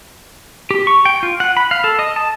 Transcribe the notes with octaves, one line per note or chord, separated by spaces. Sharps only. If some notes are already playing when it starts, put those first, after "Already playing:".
G4
C#6
G5
F4
F#5
B5
F5
A4
D#5
A5